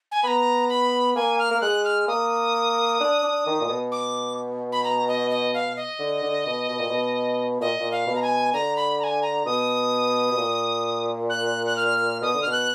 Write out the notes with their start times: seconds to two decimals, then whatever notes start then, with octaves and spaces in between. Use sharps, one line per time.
0.12 G#5
0.23 B3 A#5 B5
0.69 B5
1.16 A#3 G#5
1.39 F6
1.51 A#3
1.61 G#3 F#6
1.84 F6
2.08 A#3 D#6
3.00 D4
3.23 D4
3.47 D#3
3.61 A#2
3.69 B2
3.92 D6
4.72 B5
4.84 A#5
5.08 D#5
5.31 D#5
5.54 F5
5.76 D#5
5.99 D3
6.23 D3
6.46 B2
6.69 B2
6.79 A#2
6.89 B2
7.61 A#2 D#5
7.80 A#2
7.92 F5
8.07 B2
8.15 A#5
8.22 G#5
8.54 D3 A#5
8.77 B5
8.99 A#5
9.04 G#5
9.22 A#5
9.45 B2 D#6
10.32 B2
10.37 A#2
11.30 F#6
11.66 F#6
11.77 F6
12.21 B2 D#6
12.34 D3
12.42 B2 F6
12.52 F#6